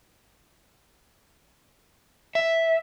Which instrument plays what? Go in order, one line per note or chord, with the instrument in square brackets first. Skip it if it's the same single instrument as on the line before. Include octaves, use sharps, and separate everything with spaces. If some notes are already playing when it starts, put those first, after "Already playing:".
[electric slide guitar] E5